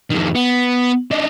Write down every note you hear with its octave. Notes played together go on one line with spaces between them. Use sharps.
F2 D#3
B3
D4 D#4